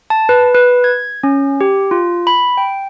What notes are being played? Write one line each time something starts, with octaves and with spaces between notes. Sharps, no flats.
A5
B4
B4
G#6
C#4
G4
F4
B5
G5